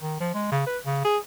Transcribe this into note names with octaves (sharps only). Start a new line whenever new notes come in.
D#3
F3
G#3
C#3
B4
C#3
G#4